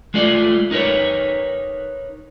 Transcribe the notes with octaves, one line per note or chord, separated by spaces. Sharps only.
G#3 A3 F4 D5
D#4 A#4 B4 C#5